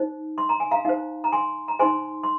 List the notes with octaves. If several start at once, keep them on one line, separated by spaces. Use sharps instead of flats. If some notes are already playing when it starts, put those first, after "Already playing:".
Already playing: D#4 C5
C6
A#5
G#5
F5 A#5
D#4 C5 F5
A#5
G#5 C6
A#5
D#4 C5 G#5 C6
C6